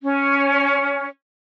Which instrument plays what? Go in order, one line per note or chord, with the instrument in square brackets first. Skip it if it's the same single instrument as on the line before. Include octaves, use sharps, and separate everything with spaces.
[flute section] C#4